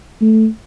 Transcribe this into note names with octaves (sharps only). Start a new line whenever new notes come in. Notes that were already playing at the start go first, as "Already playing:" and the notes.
A3